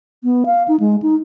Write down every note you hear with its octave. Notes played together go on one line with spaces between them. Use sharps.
B3
F5
D#4
G#3
D#4